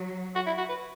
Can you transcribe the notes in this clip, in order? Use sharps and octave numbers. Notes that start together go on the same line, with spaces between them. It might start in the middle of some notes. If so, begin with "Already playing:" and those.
Already playing: F#3
F#4
E4
F#4
B4